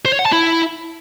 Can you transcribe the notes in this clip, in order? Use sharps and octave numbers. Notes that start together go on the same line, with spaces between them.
C5
C#5
F#5
A5
E4